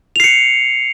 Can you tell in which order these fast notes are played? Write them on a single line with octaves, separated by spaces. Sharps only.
F7 C7 C#7